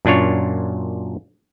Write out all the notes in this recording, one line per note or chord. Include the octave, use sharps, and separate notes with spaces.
F#2 A#2 D4 F4 C#5